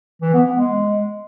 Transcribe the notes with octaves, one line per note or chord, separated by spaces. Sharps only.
E3
B3
B3
G#3